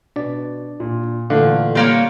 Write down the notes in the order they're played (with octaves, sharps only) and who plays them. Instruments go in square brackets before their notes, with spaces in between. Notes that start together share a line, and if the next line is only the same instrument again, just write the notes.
[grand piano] B2 [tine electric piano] D4 D5
[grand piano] A#2
[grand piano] A#2 E3 A3 [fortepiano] D3 [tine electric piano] F5
[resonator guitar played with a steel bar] G3 A#3 C#5 [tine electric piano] F5 C6